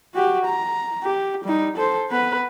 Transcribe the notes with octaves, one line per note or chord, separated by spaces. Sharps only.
F#4 G4
A#5
G4
G3 D#4
A4 C5
B3 B4